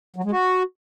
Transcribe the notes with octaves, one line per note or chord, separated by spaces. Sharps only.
F#3
G#3
F#4